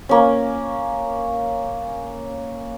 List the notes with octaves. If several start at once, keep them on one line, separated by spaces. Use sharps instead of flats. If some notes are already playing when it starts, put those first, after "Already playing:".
A#3 C#4